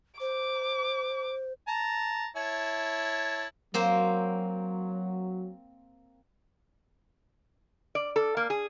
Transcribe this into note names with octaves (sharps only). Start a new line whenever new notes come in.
C5 D6
A5 A#5
E4 C#5 A5
F#3 A#3 C4 C5
D5
A4
A#3
G#4